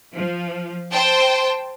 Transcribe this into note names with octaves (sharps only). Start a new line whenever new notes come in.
F3
C5 G5 A5